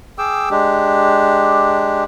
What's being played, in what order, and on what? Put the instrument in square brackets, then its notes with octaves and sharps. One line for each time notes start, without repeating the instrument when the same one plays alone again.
[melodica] G#4 G5 D6 E6
G#3 D4 G4